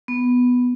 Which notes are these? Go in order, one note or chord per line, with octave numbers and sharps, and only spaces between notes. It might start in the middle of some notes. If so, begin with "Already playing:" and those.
B3